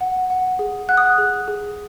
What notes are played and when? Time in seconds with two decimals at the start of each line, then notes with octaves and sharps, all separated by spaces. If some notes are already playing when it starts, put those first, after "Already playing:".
0.01 F#5
0.30 F#5
0.59 G#4
0.89 F#5 F#6
0.97 D#6
1.06 F#6
1.18 G#4
1.48 G#4